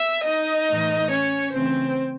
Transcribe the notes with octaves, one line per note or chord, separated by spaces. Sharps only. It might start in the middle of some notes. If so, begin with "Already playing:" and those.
Already playing: E5
D#4 D#5
A2 E3 A3
C#4 C#5
C#3 E3 A3 C4 C#4 C5